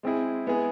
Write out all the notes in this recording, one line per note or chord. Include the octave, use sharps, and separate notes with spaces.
G#3 C4 E4 G#4
G#3 B3 E4 G#4